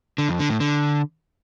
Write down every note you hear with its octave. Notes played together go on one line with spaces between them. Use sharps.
D3
F2
D3
A2
D3